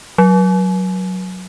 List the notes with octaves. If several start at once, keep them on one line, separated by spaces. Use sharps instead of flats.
F#3